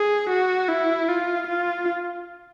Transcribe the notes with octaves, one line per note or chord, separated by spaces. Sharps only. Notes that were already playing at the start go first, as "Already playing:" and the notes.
Already playing: G#4
F#4
E4
F4
F4